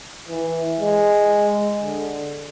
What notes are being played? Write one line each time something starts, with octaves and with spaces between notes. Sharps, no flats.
E3
G#3
D3